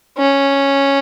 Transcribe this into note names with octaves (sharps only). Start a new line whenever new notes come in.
C#4